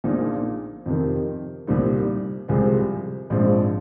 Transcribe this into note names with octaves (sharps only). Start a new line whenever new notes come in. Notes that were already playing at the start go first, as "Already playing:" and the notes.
A#1 A#2 F3 A#3 D#4
F2 C3 D#3
C2 A#2 G3 C4 D#4
C2 C3 F3 G#3 C4
A#1 G#2 F3 C4